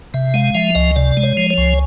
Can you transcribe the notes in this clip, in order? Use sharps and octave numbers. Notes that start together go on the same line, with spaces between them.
C3 E5
G#3 F5
F3 E5
C#2 D#5
C3 D5
G#3
C#5
F3
C#5
C#2